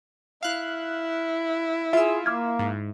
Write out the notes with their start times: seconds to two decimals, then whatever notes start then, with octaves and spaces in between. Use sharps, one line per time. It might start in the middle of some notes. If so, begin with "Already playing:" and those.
0.43 E4 F5 F#6
1.93 F4 G#4 E5 E6
2.26 A#3 D6 F6 G#6
2.59 G#2